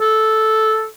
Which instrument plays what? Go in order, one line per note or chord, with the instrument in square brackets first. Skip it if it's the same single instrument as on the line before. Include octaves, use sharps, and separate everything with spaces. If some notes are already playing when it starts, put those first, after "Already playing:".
[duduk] A4